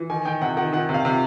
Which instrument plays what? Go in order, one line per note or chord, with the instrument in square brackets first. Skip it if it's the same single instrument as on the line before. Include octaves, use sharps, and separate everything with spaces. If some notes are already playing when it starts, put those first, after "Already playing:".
Already playing: [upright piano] E3
D#3 G#5
D#3 G5
C3 F#5
D#3 F#5
D#3 F#5
C3
F5
C3